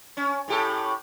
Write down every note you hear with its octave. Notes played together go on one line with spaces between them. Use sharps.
C#4
A2 G4 A4